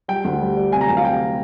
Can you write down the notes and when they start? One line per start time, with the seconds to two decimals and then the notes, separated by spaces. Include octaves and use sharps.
0.08 G3 G5
0.24 D2
0.41 G3
0.57 G3
0.72 C3 G#5
0.81 A#5
0.89 D2 G#5
0.97 F5
1.05 C3 G5